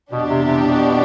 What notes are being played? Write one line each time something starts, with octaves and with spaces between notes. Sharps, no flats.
F2 B2 E3 B3 D4 G4
C3
C3
B2